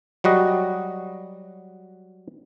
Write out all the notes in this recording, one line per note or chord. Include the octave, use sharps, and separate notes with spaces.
F#3 G3 F#4 D#5